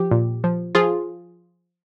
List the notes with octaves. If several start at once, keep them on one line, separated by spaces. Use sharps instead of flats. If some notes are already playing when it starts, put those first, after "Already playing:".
Already playing: F3 G4
A#2
F3
F3 F4 G#4